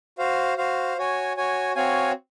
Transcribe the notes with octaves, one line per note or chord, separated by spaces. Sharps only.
F#4 C5 F5
F#4 C5 F5
F#4 C#5 G#5
F#4 C#5 G#5
C4 F#4 C#5 F5 G#5